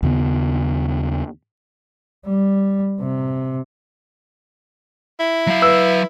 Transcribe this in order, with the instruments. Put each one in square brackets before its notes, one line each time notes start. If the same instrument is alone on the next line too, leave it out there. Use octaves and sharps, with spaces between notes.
[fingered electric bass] D#2 C#3 B3
[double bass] G3
C3
[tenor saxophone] E4
[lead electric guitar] F#3 F5
[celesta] B4 [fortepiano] E6